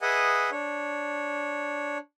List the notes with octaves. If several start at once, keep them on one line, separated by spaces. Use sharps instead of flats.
G#4 B4 D#5 E5 F#5 G#5
D4 C#5